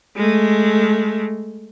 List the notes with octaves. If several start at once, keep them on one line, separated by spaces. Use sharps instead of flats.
G#3 A3